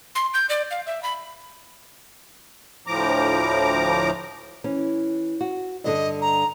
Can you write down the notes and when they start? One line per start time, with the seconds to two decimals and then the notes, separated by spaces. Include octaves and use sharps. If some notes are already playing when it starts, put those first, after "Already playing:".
0.15 C6
0.34 G6
0.49 D5
0.71 F5
0.86 E5
1.03 B5
2.87 D2 A2 F3 A#5 D6
4.64 E3 C#4
5.41 F#4
5.84 G2 D3 A4 D#5
6.21 A#5